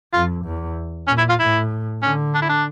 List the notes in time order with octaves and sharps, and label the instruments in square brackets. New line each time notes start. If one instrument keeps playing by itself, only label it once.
[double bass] F2 [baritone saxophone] F4
[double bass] E2
[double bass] A#2 [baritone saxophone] C#4
[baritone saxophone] E4
F4
[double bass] A2 [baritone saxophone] E4
[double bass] D3 [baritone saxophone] C#4
[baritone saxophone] D4
E4
D4